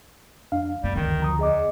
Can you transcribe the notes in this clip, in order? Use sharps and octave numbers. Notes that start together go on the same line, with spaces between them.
F2 D4 F5
F#2 G3 B3
D2 D#3 C4
F3 A#5 D#6
E2 G#4 D#5 D6